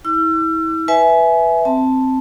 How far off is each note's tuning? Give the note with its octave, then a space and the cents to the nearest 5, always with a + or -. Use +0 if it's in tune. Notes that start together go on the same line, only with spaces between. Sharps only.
E4 -35 E6 +40
B4 +0 E5 +0 G#5 +20
C4 +0 A5 +0